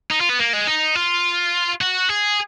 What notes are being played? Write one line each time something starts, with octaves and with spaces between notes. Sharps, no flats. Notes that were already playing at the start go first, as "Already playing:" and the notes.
D#4
F4
B3
A#3
G#3
D#4
F4
F#4
G#4